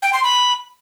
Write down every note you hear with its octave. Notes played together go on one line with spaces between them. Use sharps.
G5
C6
B5